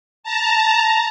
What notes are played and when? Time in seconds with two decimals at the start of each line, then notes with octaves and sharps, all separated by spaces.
0.24 A5 A#5